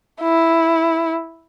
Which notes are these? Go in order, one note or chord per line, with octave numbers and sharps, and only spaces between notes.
E4